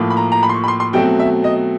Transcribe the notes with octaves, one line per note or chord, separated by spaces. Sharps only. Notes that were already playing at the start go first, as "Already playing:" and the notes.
Already playing: A2 F3 A#3
B5
A#5
A#5
B5
C6
C#6
B5
C6
C6
B2 F#3 A3 C4 G5
E5
D#5